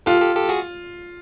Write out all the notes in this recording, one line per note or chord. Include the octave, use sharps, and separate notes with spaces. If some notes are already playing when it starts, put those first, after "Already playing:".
F4 G4 A4
G4 A4
G4 A4
F#4 G#4